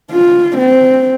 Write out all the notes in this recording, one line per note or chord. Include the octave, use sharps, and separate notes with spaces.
F4
C4